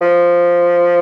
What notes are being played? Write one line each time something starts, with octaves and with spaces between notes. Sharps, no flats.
F3